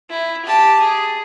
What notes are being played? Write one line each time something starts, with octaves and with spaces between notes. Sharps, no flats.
E4
G4 A5
G#4